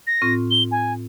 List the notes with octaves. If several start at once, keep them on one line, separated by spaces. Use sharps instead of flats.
A#6
A2 C4 F4
G7
G#5